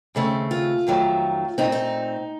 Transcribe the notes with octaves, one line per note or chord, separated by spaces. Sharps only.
D#2 C#3 A3 C4
F4
F2 D#3 F#3 A3
A#2 A3 C4 D#4
D#4